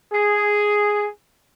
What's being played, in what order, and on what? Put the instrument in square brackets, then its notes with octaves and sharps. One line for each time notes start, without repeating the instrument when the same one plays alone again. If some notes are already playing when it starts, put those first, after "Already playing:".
[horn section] G#4